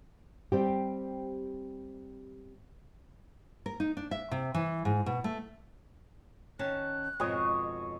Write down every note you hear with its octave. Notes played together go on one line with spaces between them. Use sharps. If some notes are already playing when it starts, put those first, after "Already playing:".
G3 C4 G4
A#4
D#4
D4
E5
C3
E3
G#2
B2
A3
D#3 C#4 A5 F#6
F2 G#2 B2 C#5 C#6 D#6